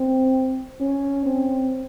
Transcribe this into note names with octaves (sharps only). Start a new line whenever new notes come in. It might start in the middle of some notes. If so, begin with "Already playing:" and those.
Already playing: C4
C#4
C4